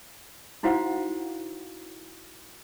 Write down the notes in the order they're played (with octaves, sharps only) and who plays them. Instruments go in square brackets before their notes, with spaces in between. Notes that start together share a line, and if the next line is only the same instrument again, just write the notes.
[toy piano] D#4 E4 F#4 C5 F5 F#5